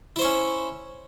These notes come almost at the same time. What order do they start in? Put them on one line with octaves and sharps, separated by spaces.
E4 C5 C#5 C#4